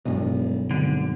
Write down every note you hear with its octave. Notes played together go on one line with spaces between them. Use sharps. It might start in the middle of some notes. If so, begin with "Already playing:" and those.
E1 B1 G2
G#1 D3